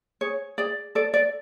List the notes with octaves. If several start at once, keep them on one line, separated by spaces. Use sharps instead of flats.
G#4 C#5
G#4 D5
A4 D5
D5